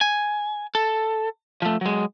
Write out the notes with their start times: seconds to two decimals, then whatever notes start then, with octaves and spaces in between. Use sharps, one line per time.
0.01 G#5
0.75 A4
1.62 F3 A3
1.81 F#3 G#3